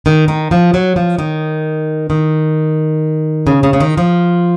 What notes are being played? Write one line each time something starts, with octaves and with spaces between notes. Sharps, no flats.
D#3
D#3
F3
F#3
F3
D#3
D#3
C#3
C#3
C#3
D#3
F3